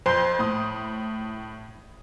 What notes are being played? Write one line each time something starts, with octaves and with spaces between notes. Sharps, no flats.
F2 C5 C6
A2 D#6